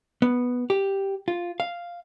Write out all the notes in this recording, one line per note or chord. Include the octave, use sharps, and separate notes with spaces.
B3
G4
F4
F5